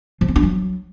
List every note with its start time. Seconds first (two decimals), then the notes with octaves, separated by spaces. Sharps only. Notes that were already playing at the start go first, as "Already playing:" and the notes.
0.21 F3
0.28 C4
0.36 D4
0.43 F#3